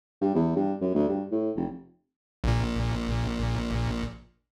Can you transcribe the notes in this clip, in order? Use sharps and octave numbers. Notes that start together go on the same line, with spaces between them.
G2
E2
G2
F#2
D2
G2
A2
F1
A#1 A#2